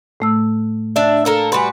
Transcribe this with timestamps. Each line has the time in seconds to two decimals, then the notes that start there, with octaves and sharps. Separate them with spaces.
0.20 A2 A3 E6
0.96 D4 E5
1.25 A#3 A4 A#4
1.52 G3 F#4 B4 G#5 C6